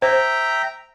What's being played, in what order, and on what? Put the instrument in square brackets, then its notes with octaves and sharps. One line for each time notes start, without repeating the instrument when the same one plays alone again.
[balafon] C5 [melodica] E5 G5 A#5